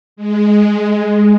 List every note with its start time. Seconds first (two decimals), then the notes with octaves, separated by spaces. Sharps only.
0.16 G#3